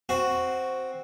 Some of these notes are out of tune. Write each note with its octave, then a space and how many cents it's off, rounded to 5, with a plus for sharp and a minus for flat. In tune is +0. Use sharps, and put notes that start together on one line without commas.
C4 +0 F#4 +0